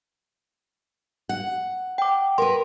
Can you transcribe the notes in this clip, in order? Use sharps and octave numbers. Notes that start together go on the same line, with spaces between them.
F#5
G5 D6
A#4 B4 C6